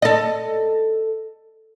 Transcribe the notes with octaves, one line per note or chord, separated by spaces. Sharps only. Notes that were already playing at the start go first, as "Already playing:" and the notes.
A4 D#5